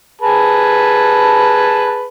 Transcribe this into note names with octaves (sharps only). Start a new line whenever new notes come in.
G#4 B4 A5